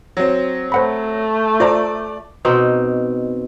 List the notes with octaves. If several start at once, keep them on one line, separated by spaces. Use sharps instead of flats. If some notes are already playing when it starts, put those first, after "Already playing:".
F#3 C4
A3 C5 F#5 B5
F4 C5 D5 A#5
B2 C4 D#4